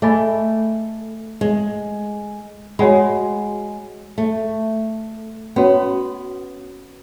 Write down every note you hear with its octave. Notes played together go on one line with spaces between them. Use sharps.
A3 G#4 D#5 G#5 B5
G#3
G#3 F#4 C#5 F#5 B5
A3
B3 C#4 F#4 C#5